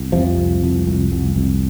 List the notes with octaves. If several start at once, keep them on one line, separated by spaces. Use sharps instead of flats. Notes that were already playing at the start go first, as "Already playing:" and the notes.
Already playing: C2
F2 C3 F3
C2
C2
C2
C2
C2